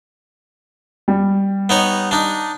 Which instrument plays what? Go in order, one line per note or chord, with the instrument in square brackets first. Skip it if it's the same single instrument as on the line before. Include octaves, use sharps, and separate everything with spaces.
[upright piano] G3
[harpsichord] B3 D#4 C#5
D4 D#4